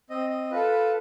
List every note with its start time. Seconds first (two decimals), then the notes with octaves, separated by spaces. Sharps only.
0.10 C4 D#5
0.30 D#5
0.51 F4 A4 B4
0.71 B4